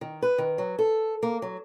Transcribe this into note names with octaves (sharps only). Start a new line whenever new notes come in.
D#3
B4
D#3
F#3
A4
A#3
F#3